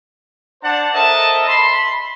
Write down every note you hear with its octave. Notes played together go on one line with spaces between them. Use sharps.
D4 C5 D5 F#5 A5
A4 A#4 C5 D#5 E5 A5
B5 C6